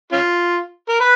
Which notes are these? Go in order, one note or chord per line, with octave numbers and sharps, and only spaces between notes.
C#4 F4
A#4
B4